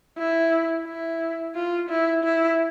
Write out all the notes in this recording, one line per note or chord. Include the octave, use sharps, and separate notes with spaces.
E4
E4
F4
E4
E4